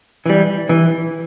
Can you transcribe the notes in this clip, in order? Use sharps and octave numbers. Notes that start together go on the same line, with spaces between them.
E3 G3
E3